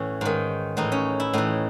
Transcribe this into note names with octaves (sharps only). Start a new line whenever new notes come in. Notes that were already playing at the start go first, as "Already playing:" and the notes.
Already playing: A2 E3 C#4
G#2 D#3
A2 E3 D#4
C#4
E4
A2 E3 D#4